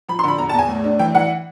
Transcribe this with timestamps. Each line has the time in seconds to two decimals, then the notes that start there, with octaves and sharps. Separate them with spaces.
0.09 F3 B5
0.19 C6
0.24 D3 B5
0.38 E2 A#5
0.49 A5
0.54 E2 G#5
0.69 A2
0.84 D4
0.99 E3 G5
1.15 E3 F#5